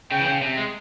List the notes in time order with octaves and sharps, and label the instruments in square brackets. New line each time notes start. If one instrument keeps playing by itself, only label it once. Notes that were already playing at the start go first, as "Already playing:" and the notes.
[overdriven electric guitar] C#3 [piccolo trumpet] G5
[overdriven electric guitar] E3
C#3
C3
G#3